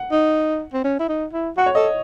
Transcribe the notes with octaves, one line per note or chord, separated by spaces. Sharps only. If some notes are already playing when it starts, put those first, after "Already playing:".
Already playing: F#5
D#4
C4
C#4
E4
D#4
E4
F#4 F#5
C#5
A4 D#5